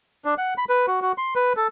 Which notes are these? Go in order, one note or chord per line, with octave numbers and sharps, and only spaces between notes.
D4
F#5
B5
B4
F#4
F#4
C6
B4
A4